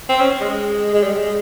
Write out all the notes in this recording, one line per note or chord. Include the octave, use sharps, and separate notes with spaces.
C4
C#4
G#3
G#3
G3
G#3